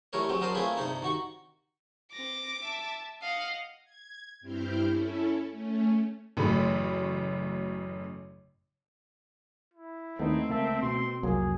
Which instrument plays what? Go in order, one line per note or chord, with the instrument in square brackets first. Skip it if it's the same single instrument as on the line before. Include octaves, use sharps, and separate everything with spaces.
[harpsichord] E3 G3 A3 A#4 C#5
F#3 G#3 C4
F#3 D4 A#4 C5 A5 D#6
A3 A#3 C4 F4 G#4 B4
G2 C3 D4 D#4
D#3 F#4 C#6
[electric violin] C4 A#6 [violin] D6
[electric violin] E5 A5
[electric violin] D#5 F#5 [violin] F5
[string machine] G#6
G2 C4 E4 G4 F6 G6
C#4 E4 A4
A3 C#4
[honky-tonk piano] A1 F#2 C#3 A3 B5
[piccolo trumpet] E4
[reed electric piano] D#2 B3 D#4 [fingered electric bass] A3 [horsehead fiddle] C4
[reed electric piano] C#2 A#3 A5 [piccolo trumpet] E5
[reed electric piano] B2 [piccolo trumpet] C6
[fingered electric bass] C2 F2 [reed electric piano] F#3 A#3 [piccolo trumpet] G#4